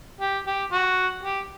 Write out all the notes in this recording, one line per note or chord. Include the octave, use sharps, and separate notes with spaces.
G4
G4
F#4
G4